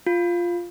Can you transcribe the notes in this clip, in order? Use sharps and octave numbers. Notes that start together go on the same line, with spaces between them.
F4